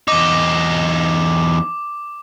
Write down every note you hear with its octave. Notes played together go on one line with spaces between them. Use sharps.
E2 D#4 D6